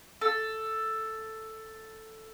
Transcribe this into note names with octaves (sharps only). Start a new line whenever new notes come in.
A4